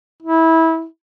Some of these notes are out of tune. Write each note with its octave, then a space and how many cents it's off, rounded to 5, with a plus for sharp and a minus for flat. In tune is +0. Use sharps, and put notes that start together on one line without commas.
E4 -20